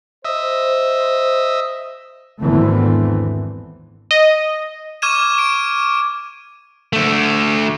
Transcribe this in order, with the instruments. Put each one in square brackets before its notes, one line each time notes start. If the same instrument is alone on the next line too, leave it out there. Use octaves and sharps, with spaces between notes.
[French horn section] C5 [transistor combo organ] D#5 E5
[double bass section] G#1 E2 D3 E3 A3 C4
[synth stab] D#5
[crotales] C#6 D6 F6 G#6 D#7 E7
D7
[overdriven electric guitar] D3 A3